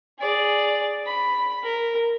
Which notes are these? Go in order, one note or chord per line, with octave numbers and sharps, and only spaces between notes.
G#4 D5
B5
A#4